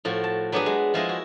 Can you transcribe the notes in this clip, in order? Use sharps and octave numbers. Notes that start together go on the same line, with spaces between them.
A2 F3 F#4
A5
F#3 B3 D4 G4 G#4 B4
G#3
F3 G#3 E4 D#5
F#4